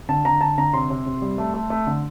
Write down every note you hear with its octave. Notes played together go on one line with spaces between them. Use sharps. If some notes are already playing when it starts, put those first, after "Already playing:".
D3 A5
D3 A#5
D3 A5
D3 A#5
C3 C6
C3
C3
G3
A3
A3
A3
D3